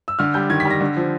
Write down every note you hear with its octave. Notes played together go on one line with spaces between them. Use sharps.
E6
D3 F6
G3 G6
D#3 G#6
B6
G3 A#6
D3
F3